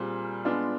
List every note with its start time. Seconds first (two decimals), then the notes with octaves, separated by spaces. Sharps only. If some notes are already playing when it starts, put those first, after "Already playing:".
Already playing: A#2 G3 C4 F4 G#4
0.45 G#3 B3 D4 F4